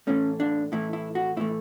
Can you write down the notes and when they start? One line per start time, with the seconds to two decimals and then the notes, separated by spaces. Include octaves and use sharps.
0.07 A2 E3 A3 C#4
0.40 D4
0.72 A2 E3 A3 E4
0.93 E4
1.15 F#4
1.36 A2 E3 A3 E4